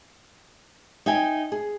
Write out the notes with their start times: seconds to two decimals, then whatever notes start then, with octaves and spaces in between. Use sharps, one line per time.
1.06 D#4 E5 G5 G#5
1.52 G#4